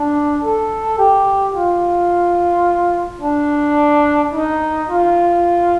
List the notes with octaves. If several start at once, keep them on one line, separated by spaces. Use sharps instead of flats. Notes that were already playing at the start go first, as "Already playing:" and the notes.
Already playing: D4
A4
G4
F4
D4
D#4
F4